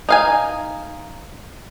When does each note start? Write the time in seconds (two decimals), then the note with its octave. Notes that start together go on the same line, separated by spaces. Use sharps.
0.09 D#4 F5 G#5